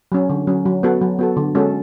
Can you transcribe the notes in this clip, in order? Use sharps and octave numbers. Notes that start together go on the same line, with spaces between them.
F#3 C#4
D3
F#3 C#4
F#3
B3 F#4 A4
F#3
B3 F#4 A4
D3
G#3 C#4 F#4 A4